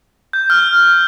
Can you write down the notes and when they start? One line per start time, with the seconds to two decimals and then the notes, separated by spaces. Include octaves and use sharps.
0.33 G6
0.50 F6